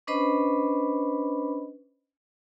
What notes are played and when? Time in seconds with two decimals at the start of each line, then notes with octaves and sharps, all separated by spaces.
0.07 C#4 D4 B4 C5 D#5 B5